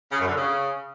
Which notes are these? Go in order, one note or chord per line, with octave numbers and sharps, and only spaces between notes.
C#3
F#2
D3
C#3